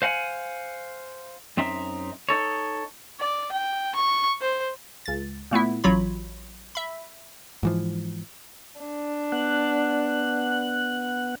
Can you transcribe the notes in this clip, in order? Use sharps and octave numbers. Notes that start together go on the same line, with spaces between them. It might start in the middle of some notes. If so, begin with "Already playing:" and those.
C5 F5 F#5 G#5
F#2 C4 D#4 E5
D#4 A4 C#5
D5
G5
C#6
C5
C#2 A6
A#2 A3 B3 E4
A1 F#3 F4 C#5 B5
E5 B5
G#2 E3 F3
D4
B3 F#5 F#6